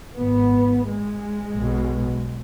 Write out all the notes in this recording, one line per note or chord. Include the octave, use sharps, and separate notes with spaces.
G#1 G#2 B3
G#3
B1 B2